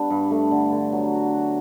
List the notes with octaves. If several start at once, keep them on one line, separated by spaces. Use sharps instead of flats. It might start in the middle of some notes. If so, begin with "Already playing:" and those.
Already playing: G3 B3 D4
G2
A3
D3
D3
F#3
F#4
F#4